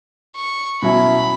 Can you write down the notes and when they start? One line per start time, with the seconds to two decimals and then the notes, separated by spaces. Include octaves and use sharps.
0.35 C#6
0.82 B2 F#3 C#4 E4 B5